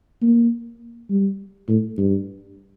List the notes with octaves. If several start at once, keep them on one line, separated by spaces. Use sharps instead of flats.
A#3
G3
A2
G2